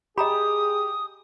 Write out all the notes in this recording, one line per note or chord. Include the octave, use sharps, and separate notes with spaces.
G4 G#4 D#5 A#5 B5 D#6